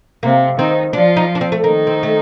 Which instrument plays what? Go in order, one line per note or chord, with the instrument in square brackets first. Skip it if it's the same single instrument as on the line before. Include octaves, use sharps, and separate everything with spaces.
[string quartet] C3 C4 [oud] A#3
[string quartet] D#3 D#4 [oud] C4
[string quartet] F3 F4 [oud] D4
[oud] D#4
D4
C4
A3
[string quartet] D#3 D#4 [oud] A#3
[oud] C4
A3